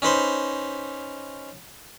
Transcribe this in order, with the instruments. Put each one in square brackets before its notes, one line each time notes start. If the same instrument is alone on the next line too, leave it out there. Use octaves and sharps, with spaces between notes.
[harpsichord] C#4 D#4 B4 C5